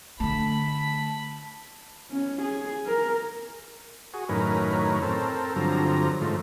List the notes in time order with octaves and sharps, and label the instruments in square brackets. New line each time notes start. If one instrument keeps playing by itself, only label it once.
[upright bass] D3 A3 [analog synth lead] A5 [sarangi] B5
[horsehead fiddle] C#4
G#4
A#4
[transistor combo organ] F#4 G#4
F#2 A2 D#3 C#4 A#4 B4
C4 A4 A#4
G2 D3 F3 F#3 C4 A#5
G#2 F3 A3